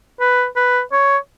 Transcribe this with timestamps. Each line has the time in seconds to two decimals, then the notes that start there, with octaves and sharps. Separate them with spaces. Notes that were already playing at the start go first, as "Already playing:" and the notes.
0.20 B4
0.56 B4
0.92 C#5